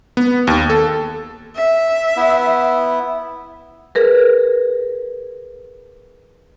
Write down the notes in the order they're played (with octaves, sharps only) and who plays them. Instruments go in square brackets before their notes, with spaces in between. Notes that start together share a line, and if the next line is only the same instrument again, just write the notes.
[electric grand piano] B3
D#2
A4
[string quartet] E5
[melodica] B3 E4
[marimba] G#4 A#4 B4